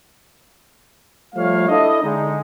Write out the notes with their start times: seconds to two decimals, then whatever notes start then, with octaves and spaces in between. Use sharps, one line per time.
1.35 F3 G3 A3 C#5 F5
1.68 D4 E4 A4 D#5
2.02 D3 G#3 D#4